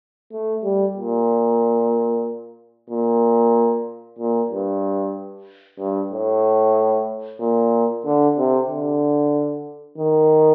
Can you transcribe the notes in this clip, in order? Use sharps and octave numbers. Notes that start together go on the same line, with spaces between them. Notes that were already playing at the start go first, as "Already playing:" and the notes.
A3
G3
A#2
A#2
A#2
G2
G2
A2
A#2
D3
C3
D3
D#3